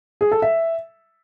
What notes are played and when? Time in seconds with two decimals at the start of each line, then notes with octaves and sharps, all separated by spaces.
0.21 G#4
0.32 A4
0.42 E5